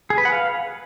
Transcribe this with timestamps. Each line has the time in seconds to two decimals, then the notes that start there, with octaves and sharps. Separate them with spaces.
0.10 G#4
0.18 B4
0.25 F#5
0.32 F5